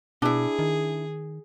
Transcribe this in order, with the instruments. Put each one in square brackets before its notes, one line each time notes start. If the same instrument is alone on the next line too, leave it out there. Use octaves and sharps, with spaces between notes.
[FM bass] B2 [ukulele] D4 E4 [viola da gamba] G#4
[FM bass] D#3